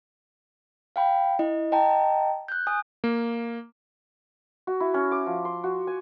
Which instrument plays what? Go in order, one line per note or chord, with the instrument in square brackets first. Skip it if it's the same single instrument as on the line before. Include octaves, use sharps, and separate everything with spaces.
[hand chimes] F5 G5 B5
E4 D#5
D#5 G5 A5 A#5
F#6 G6
G#5 D#6
[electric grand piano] A#3
[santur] F#4
E4
C#4
D6
F3
C6
F#4
G#5